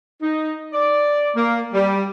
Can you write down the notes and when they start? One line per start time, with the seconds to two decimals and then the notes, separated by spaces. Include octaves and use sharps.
0.22 D#4
0.73 D5
1.36 A#3
1.73 G3